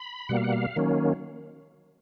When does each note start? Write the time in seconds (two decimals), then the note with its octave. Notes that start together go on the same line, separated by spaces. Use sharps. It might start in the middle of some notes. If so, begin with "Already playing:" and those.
Already playing: B5
0.29 B2 G3 A#3 F#5
0.37 F5
0.44 F#5
0.52 F5
0.76 D#3 F#3 A#3 C#4